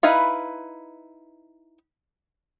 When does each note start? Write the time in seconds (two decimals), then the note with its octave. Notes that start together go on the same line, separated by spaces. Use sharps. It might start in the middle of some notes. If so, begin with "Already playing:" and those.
0.03 D#4 E4 B4 F5 B5